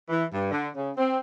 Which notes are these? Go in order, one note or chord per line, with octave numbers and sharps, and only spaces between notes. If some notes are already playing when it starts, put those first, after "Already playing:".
E3
G2
D3
C#3
C4